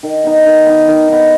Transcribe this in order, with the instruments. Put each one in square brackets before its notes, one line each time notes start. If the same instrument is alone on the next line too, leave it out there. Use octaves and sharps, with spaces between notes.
[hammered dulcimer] D#3
B3 D#4
D#3
B3 D#4
D#3
B3 D#4